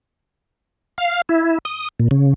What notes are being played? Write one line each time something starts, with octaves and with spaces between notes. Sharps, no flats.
F5
E4
D#6
A#2
C#3